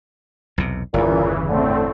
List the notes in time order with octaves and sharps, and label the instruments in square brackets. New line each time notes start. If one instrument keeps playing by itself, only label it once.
[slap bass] B1 E2 C3
[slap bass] G1 E2 [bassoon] A#2 [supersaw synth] C#3 E3
[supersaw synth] A2 A3 C4 [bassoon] D3